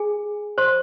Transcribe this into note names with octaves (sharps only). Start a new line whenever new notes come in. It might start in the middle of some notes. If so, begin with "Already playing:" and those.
Already playing: G#4 G#5
C5 C6